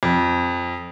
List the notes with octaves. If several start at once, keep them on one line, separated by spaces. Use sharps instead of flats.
F2